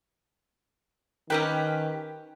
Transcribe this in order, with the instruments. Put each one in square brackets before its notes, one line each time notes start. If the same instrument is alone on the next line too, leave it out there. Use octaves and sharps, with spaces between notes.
[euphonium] D#3 [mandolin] C#4 G4 B4 [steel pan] A#4 G5